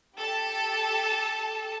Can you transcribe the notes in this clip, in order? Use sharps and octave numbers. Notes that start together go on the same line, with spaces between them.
G4 A4 A5